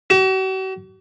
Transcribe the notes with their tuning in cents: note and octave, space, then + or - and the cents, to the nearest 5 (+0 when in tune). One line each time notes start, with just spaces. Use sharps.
F#4 +45